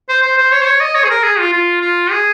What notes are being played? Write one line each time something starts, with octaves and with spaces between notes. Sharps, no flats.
C5
C5
C5
C#5
C5
C#5
D#5
C#5
G#4
A#4
G#4
F4
F4
F4
G#4